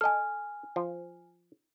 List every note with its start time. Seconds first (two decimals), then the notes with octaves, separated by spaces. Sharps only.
0.01 A4 D#5 G#5 F6
0.76 F3